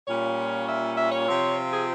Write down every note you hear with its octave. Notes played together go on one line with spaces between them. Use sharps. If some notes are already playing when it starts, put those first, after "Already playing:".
A#2 G3 C#4 F4 C#5
E5
E5
C#5
C3 F3 C4 F4
G#4